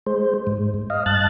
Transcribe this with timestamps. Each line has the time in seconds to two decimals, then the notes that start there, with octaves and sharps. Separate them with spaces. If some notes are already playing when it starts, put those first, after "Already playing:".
0.06 G#3 C5
0.47 G#2
0.90 D#5 F5
1.06 G2 A5 F#6 A6